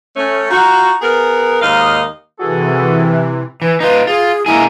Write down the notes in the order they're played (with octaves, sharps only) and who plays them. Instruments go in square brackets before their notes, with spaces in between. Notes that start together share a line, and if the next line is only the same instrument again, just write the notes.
[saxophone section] A3 C#4
D#4 F4 F#4
B3 G#4 A#4
D#2 G#2 D#4 D#5 F5
[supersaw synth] C3 E3 [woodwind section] F#4 G#4 A4
[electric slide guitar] E3 [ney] B4
[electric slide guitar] D#4 F4 [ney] B4
[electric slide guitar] F4 [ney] G#4
[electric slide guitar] A#3 D#4 G#4 [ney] E4